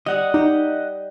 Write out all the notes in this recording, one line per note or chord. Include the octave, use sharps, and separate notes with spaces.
G3 D#5 F#5
D#4 G4